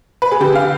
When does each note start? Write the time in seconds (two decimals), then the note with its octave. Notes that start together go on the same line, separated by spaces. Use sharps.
0.22 B4
0.32 G#4
0.40 D3 G4
0.55 F5